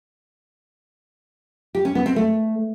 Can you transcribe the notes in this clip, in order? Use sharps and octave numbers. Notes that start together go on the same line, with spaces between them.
G4
C#4
B3
C4
A3